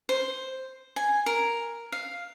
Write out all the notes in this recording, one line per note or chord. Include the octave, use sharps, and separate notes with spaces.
C5
G#5
A#4
F5